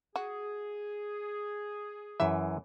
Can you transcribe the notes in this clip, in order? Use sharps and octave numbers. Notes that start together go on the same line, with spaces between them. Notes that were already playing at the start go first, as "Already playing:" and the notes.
F#4 G#4
F#2 E3 E5